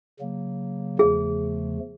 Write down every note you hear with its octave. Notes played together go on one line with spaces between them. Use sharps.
C#3 F#3 A#3
E2 C#3 F3 A3 G#4